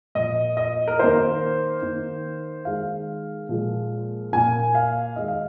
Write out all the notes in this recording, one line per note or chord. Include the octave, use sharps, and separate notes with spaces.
A#2 F3 A#3 D#5
D#5
A#4
D#3 A#3 C5
D#3 A#3
D#3 G#3 F5
A#2 F3 G#3
A#2 A#3 G#5
F5
D#3 G#3 D#5
F5